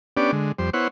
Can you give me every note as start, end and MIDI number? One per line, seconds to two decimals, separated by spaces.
0.17 0.31 59
0.17 0.31 61
0.17 0.31 62
0.17 0.31 67
0.17 0.31 74
0.32 0.52 50
0.32 0.52 56
0.58 0.70 41
0.58 0.70 55
0.58 0.70 72
0.74 0.88 59
0.74 0.88 64
0.74 0.88 72
0.74 0.88 73
0.74 0.88 78